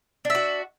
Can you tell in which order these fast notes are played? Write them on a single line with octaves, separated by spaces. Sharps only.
D4 E5 F#4